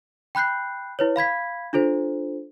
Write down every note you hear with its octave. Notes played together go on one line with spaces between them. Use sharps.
G5 B5 F#6 G6 C7
E4 B4 C#5
F5 B5 G#6 B6
D4 F4 A4 C5